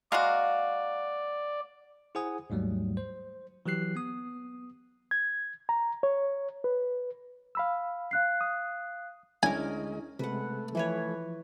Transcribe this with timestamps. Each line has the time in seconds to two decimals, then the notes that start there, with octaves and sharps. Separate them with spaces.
0.12 G#3 A#3 F#4 D5 F5 A#5
2.15 E4 G#4 C5 F#5 G#5 D#6
2.50 D#2 G#2 F#3 G3 A3
2.97 C5
3.66 E3 F#3 G4 F#6 C7
3.96 B3 D#6
5.11 G#6
5.69 A#5
6.03 C#5
6.64 B4
7.55 F5 B5 E6
8.11 F5 F#6 C7
8.41 D#6
9.43 D2 G#3 C#4 D4 E4 A#4 D#5 G#5
10.19 C3 G#3 A3 B4 F#5
10.75 E3 F3 B4 C#5